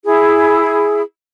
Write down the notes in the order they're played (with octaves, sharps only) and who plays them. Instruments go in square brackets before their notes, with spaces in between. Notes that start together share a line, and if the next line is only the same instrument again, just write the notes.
[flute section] E4 G#4